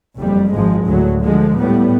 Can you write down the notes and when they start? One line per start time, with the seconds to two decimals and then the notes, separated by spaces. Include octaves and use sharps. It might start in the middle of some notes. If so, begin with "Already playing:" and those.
0.18 F#1 F2 G3
0.52 G#1 G#2 F3 G#3
0.85 D2 A2 F#3
1.21 D3 F3 G#3
1.58 A2 G3 B3